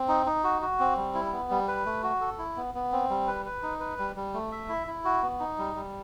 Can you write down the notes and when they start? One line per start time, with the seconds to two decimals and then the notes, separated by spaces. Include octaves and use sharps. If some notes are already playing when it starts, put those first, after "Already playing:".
Already playing: C4
0.08 D#4
0.26 D#4
0.44 F#4
0.62 F#4
0.80 C4
0.97 G3
1.14 E4
1.32 B3
1.50 G3
1.68 B4
1.86 A3
2.03 F#4
2.21 A4
2.39 E4
2.56 B3
2.74 B3
2.92 C4
3.10 G3
3.28 B4
3.45 B4
3.63 D#4
3.80 B4
3.98 G3
4.16 G3
4.34 A3
4.52 E5
4.69 E4
4.87 E4
5.05 F#4
5.22 B3
5.40 D#4
5.58 G3
5.75 G3